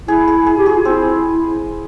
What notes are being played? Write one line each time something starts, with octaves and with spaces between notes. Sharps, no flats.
E4 G#4
G#4
G#4
G4
F#4 G#4
F4
C4 E4